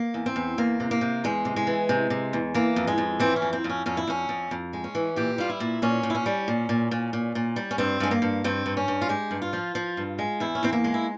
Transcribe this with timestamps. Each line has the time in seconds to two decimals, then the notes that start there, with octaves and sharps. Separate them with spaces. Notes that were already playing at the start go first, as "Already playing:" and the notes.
Already playing: A#3
0.14 E2
0.26 C4
0.36 E2
0.58 E2 A#3
0.80 C3
0.91 A#3
1.01 C3
1.24 E2 G#3
1.45 C3
1.56 G#3
1.67 E3
1.89 C3
2.10 C3
2.33 E2
2.54 E3 A#3
2.76 F2
2.87 G#3
2.98 F2
3.20 E3 C4
3.36 C#4
3.42 F2
3.53 C4
3.64 F2
3.69 C#4
3.86 F2 C#4
3.97 E4
4.08 F2 C#4
4.29 F2
4.51 F2
4.73 G#3
4.84 C#4
4.95 E3
5.16 A#2 G4
5.38 G3 F4
5.50 E4
5.60 A#2
5.82 A#2 C#4
6.03 A#2
6.10 E4
6.15 C#4
6.26 G3
6.48 A#2
6.69 A#2
6.91 A#2
7.13 A#2
7.35 A#2
7.56 G3
7.71 C#4
7.78 G2 C4
8.00 G2 G#3
8.11 A#3
8.22 G2
8.44 G2 C4
8.66 G2
8.77 C#4
8.88 G2
9.02 F4
9.09 G#3 G4
9.31 G2
9.42 F4
9.53 F3
9.75 F3
9.97 G2
10.19 G#3
10.40 E2 E4
10.55 C#4
10.63 E2 C4
10.73 A#3
10.84 G#3
10.94 E4